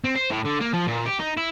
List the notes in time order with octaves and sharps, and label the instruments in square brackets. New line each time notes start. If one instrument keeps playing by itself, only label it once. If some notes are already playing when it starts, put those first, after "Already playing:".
[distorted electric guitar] C4
C5
A2
D3
A#3
F3
A#2
G4
D#4
E4